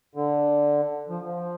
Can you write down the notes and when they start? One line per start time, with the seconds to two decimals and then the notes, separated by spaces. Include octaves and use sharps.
0.15 D3
1.09 F3
1.24 F3